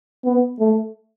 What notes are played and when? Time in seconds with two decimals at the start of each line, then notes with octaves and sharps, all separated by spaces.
0.25 B3
0.59 A3